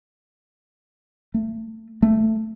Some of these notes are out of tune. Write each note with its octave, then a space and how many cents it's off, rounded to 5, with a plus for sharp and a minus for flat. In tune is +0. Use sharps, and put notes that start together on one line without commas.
A3 +25
A3 +5